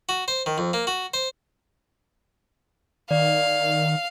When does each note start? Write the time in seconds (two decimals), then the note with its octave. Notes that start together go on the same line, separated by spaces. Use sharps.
0.09 F#4
0.28 C5
0.46 D#3
0.58 F2
0.73 A#3
0.87 F#4
1.14 C5
3.11 D#3 D5 F5